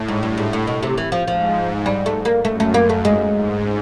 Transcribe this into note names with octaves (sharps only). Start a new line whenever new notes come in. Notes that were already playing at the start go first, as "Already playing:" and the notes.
Already playing: A2
G#2
G2
G#2
A2
B2
C3
E3
F3
G#2 F3
G3
A3
A#3
F#2 A3
A3
A#3
A3
G#2 G#3
G#2